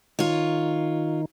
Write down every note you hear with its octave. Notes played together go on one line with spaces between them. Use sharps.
D#3 F4 C#5